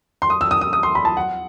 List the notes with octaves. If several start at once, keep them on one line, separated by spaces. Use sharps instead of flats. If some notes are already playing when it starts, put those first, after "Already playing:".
C6
D#6
E6
D#6
D#6
D#6
C6
B5
A5
F#5